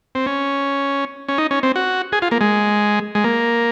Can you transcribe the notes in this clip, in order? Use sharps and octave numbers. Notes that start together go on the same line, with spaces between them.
C4
C#4
C#4
D#4
C#4
C4
F#4
G#4
F4
A#3
G#3
G#3
A#3